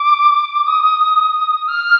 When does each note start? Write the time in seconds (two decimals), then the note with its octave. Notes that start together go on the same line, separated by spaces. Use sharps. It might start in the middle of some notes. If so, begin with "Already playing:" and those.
Already playing: D6
0.66 D#6
1.68 F6